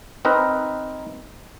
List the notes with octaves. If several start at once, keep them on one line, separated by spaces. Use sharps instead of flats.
C4 D#4 A#4 B4